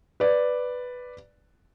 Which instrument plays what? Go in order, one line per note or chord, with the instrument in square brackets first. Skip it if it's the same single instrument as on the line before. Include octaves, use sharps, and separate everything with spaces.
[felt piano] B4 D5